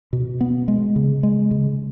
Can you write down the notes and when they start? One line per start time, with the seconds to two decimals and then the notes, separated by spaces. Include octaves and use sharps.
0.13 B2
0.41 B3
0.68 G#3
0.96 C#3
1.23 G#3
1.51 C#3